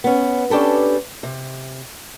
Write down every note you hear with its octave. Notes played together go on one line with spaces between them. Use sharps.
B3 C#4
C#4 D4 G4 A4 B4
C3